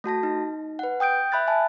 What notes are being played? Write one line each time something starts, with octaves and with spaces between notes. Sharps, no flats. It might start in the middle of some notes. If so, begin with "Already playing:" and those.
A3 F#4 A5 A#6
D#4
B4 F#5
G5 D#6 G6 D7
E5 B5 F#6 A6
E5 G#5 A5